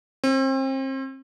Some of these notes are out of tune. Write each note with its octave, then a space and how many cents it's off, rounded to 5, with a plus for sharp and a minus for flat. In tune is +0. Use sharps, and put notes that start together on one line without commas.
C4 +35